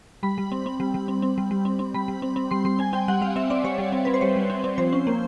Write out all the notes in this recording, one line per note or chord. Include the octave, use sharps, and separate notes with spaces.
G3 B5
G3
C4
C4
G3
G3
C4
C4
G3
G3
C4
C4
G3 B5
G3
C4
C4
G3 C6
G3 C6
C4 G#5
C4 G5
G3 F#5
G3 F5
C4 E5
C4 D5
G3 C#5
G3
C4
C4 B4
C5
G3 C#5
G3
C4
C4
F3 C5
C#4
A#3